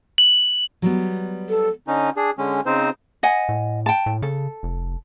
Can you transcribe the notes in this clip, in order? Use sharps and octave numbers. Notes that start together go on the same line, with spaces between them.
F#7
F#3 G3 B3
A4
D3 C#4 D#4
D4 G#4
D3 G#3 C#4
C#3 C4 D#4 C5
D#5 F#5 G#5
A2
G5 A5
A2
C#3 A4
F1